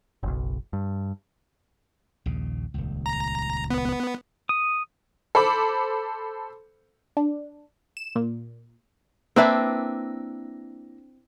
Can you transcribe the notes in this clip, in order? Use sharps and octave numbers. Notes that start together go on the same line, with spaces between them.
F#1 B1
G2
A#1 D#2 C#3
D#1 C#2
A#5
B3
D#6
A4 C5 B5 D6
D4
E7
A#2
A#3 C4 D4 E4 B4 E5